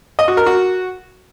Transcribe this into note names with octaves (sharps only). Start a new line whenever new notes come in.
D#5
F#4
A#4
F#4